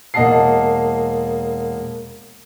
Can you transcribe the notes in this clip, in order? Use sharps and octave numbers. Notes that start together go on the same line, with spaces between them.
E1 A#3 D#5 F#5 A5 C7